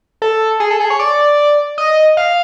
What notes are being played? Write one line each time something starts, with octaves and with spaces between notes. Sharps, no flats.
A4
G#4
A4
G#4
C#5
D5
D#5
F5